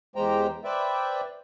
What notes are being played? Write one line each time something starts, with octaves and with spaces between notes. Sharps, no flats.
E2 G#3 G4 C5 G5 A#5
B4 C5 D5 E5 G5